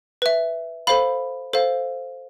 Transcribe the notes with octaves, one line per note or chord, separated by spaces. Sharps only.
B4 E5
A4 C5 F5 B5
A4 C5 F5